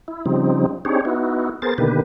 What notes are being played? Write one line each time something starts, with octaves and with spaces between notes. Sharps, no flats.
E4
C#3 F3 G3 C4 D#4
C4 D4 D#4 G4 G#4 C#5
B3 D#4 E4 F#4
B3 G#4 A#4 C5 A6
B2 D3 D#3 A#3 G4 B4